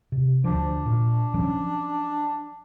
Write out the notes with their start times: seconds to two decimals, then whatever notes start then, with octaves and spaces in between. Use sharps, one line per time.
0.12 C3
0.44 D2 F3 D4
0.86 A#2
1.34 F3 F#3 C#4